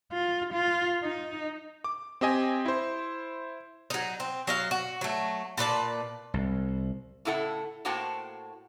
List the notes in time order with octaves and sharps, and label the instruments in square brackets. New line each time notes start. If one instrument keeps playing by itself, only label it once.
[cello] F4
F4
D#4
[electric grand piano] D6
C4 G4 D#5 G#5
E4 C5
[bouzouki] F#3 D#4
C4
F#3 D#5 F5
F#4
F#3 A3
A#2 B4 D5 A5
[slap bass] C2
[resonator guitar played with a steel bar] A2 C#3 E4 A4 F#5
A2 A#3 F#4 C5 G5 A5